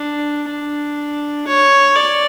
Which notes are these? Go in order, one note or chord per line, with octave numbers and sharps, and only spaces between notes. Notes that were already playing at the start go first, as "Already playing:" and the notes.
Already playing: D4
D4
C#5
D5